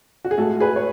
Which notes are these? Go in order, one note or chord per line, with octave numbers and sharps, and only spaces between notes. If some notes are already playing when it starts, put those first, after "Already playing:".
F#4
G#4
A2 G#3 F#4 A4
G#4 B4
C#5